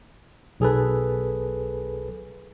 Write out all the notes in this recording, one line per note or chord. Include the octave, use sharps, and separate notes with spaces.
B1 G#4 A4 B4